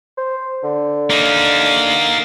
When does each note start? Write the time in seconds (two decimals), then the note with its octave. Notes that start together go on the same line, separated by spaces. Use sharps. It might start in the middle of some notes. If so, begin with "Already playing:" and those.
0.17 C5
0.63 D3
1.10 A#3 D#4